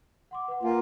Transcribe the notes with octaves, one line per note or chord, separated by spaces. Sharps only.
F#5 C6 D6
B4 F#5
A#3 F4 F#5 G#5